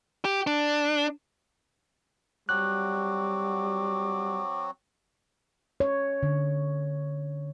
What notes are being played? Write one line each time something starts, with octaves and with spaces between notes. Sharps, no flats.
G4
D4
F#3 G3 C4 F#4 D6 F#6
C#5
D3